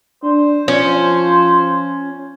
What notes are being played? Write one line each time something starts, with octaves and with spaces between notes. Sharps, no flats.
D4 C5
F3 C#4